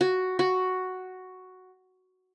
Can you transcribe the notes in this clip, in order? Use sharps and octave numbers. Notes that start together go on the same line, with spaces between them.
F#4
F#4